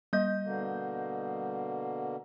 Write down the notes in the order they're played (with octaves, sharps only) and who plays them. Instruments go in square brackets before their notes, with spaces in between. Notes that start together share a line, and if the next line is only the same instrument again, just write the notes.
[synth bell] G3 G6 [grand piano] D#5
[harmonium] B2 D3 A#3